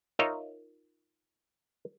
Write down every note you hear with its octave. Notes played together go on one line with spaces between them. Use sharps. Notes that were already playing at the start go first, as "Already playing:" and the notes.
D#4 F4 A#4 C#5 D#5 E5